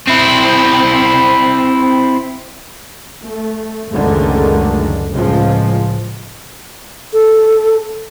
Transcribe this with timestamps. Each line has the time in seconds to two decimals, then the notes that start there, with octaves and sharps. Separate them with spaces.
0.08 C4 E4
3.25 A3
3.93 F#1 C#2 D3 D#3 G#3 A3
5.13 C#2 A2 F3 G#3
7.13 A4